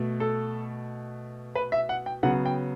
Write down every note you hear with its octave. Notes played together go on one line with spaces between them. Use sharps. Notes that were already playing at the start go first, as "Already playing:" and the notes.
Already playing: B2 A3
A4
B4
E5
F#5
G5
C#3 F#3 B3 F#5
G5